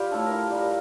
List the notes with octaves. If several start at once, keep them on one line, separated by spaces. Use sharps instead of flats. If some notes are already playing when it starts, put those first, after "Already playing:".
Already playing: G3 F4 G4 C#5
A2 A4
A#4
A2
G3 A#4